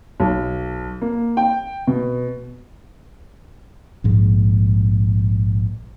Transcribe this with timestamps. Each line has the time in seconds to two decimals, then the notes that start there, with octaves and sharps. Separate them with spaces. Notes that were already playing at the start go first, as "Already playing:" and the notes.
0.20 B1
1.02 A#3
1.37 G5
1.87 B2
4.04 A#1 G#2 G#3